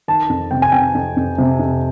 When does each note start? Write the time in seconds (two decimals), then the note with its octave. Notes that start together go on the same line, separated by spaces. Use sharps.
0.08 D#3 A5
0.29 F2
0.51 C3 G5
0.62 G#5
0.72 C3 G5
0.94 F2
1.17 F2
1.38 C3
1.59 F2